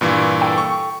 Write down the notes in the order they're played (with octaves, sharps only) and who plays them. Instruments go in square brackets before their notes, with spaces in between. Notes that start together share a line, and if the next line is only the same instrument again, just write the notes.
[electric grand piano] G2 A#2 E3
[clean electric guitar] A4 G5
[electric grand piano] C#6